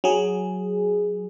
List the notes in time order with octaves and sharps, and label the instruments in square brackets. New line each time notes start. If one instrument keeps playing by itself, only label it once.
[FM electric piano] F#3 G#4